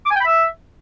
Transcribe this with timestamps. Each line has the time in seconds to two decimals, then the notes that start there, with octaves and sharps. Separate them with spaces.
0.06 D6
0.11 G#5
0.16 G5
0.21 B5
0.26 E5